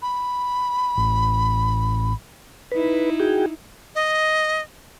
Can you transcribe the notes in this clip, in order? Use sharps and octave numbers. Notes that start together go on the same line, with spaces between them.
B5
A1
D#4 E4 B4
F#4 G#4 G5
D#5